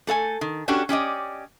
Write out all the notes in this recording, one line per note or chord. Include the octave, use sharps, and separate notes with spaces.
A3 A4 F5 G#5
D#3
C#4 D4 F#4 G4 A4
C#4 G4 D5 D#5